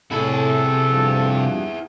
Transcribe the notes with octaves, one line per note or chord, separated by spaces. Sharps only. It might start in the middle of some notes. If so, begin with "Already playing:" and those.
A2 C3 E4 G#4 A4 B5
G2 F3